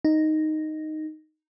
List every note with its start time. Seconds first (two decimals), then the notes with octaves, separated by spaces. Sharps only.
0.05 D#4